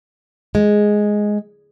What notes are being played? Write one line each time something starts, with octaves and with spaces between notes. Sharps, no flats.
G#3